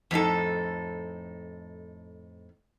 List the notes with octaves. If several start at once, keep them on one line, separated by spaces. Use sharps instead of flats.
F2 A2 D#4 A4